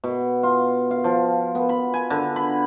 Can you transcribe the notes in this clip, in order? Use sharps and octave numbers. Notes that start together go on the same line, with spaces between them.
B2
F4
F5
F3
B3
B5
G#5
D3
B5